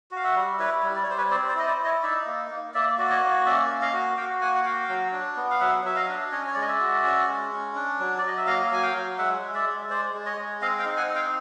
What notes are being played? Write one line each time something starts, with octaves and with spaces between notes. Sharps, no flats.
F#4 F5
E5 F#5
G3
E4 B4 C#5
G3
D5
C#5
G3 C5
B4 C#5
C4 C5 D5
C5 D5
E4 D#5
C5 D5
E4
C#5 D#5
D#4 D5 E5
A#3
A#3
A#3 D5 E5
F#4 D5
C#5 D#5
A#3
C#4 D5 E5
A#3
D#5 F5
F#4
F#4 F5 G5
A#3 F#5 G#5
F#5
F#4 F5 G5
F#3
D4
B3
F5
F#3 E5 F#5
F#3 E5
D#5 F5
D4
C#4 C#5 D#5
C#5
G#3 D5
D#5
D5 E5
F#4
C#4
G#3
C#4
D4
F#3
F#3 D5
D#5
E5
A#3 D#5 F5
F#3 G#5
F5 G5
F#3
G#3 E5 F#5
G#3
D5 E5
G#3
G#3 C5 D5
G#3
C#5 D#5
G#3
C4 D#5 F5
F5 G5
D#4
F#5 G#5
C4
F5 G5